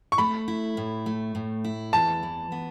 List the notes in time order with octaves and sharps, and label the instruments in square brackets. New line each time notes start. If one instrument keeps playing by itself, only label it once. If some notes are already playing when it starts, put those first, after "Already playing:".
[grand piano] C#6
[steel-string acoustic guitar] A3 [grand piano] B5
[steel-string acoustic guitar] E4
A2
A3
A2
E4
[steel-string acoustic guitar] E2 [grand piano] A5
[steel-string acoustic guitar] E3
B3